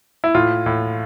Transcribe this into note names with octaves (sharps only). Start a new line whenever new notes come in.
E4
A2 F4
A2